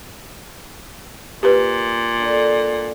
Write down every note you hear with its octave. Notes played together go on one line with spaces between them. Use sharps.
A#2 G4 B4
D3 D4